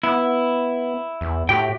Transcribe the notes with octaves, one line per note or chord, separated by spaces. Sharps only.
B3 E4
E2
A2 F#4 G4 G5